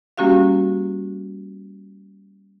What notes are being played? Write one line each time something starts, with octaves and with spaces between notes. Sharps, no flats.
G3 A#3 C#4 F#4 G4 F5